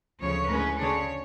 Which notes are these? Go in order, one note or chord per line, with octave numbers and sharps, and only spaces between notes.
D2 C#3 F3 C#5
A2 G#3 C#4 B4
D2 C#3 G#3 D4 C#5